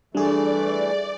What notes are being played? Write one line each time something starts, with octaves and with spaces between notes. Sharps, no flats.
E3 G3 A3 D4 G#4 D5